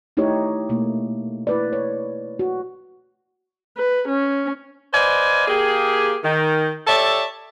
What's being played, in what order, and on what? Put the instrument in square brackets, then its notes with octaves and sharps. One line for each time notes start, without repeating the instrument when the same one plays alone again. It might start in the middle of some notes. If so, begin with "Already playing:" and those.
[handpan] A3 D#4 E4 G4 C#5
B2 A3 A#3
E4 B4 D5
C#5
F#4
[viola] B4
C#4
[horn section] B4 C5 D5 D#5 F5 G#5
A#3 G4 G#4
D#3
G4 A4 C#5 D5 E5 A5